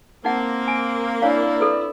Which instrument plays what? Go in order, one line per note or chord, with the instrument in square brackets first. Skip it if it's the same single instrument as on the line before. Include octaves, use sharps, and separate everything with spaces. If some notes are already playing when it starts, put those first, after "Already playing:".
[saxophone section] A#3 [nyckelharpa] C4 [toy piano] D#4 F#5
[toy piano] G#5
[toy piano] D4 C#5 F5 [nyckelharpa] E4 [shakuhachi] D5
[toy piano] A4 B4